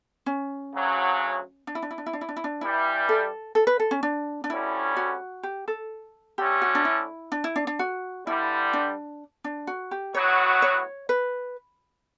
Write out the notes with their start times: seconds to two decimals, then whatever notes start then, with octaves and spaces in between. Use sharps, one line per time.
0.26 C#4
0.74 D2 C#3 F#3
1.67 D4
1.75 E4
1.82 D4
1.91 E4
1.98 D4
2.06 E4
2.13 D4
2.21 E4
2.29 D4
2.36 E4
2.44 D4
2.61 G2 E3 G3 E4
3.09 A4
3.55 A4
3.67 B4
3.80 A4
3.91 C#4
4.03 D4
4.44 D4
4.50 D2 D3 G3 C#4 E4
4.97 F#4
5.43 G4
5.68 A4
6.38 D3 A3 C#4 G4
6.61 F#4
6.75 D4
6.85 E4
7.32 D4
7.44 E4
7.56 D4
7.67 D4
7.79 F#4
8.26 G2 D3 G3 E4
8.73 D4
9.44 D4
9.67 F#4
9.91 G4
10.14 A2 F#3 B3 F#4 C#5
10.62 C#5
11.09 B4